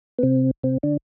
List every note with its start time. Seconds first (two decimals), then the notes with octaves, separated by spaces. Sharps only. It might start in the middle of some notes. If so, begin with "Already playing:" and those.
0.19 B3
0.23 C3 C4
0.63 C3 C4
0.83 D3 D4